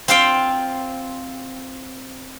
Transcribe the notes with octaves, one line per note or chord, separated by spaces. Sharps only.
C4 F4 C5 F5 G5